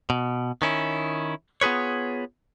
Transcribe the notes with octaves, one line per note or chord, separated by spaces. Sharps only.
B2
D#3 C#4 E4
B3 F4 G#4 B4 C#5